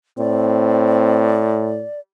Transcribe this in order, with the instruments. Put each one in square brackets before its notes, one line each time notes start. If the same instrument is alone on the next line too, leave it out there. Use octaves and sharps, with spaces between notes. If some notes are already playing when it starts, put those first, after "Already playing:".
[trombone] A2 [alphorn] C4 [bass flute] D5